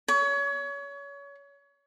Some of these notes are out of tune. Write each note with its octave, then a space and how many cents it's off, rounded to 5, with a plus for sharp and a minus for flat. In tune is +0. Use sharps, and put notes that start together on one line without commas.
C#5 +30